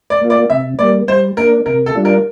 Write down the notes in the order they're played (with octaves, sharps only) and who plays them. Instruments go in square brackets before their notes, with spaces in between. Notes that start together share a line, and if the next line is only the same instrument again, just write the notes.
[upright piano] D5
[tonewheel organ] A#3 F4
[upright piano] D5
[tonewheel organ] C3 [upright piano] E5
[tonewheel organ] G3 A#3 [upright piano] D5
[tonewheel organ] G3 [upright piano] C5
[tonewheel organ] A#3 D4 [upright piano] A#4
[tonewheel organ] C3 [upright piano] A#4
[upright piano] A4
[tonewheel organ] G3 D4 F4
[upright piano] A#4